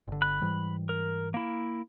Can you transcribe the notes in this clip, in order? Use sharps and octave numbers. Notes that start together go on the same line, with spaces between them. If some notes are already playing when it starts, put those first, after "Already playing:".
G1 D3
B5 F#6
G#2 E3 G3
A#4
A#3 E4